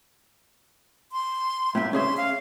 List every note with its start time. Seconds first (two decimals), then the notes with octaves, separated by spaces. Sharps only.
1.12 C6
1.75 A2 A#3 E5
1.93 C#4 G#4 E5 C6
2.17 F5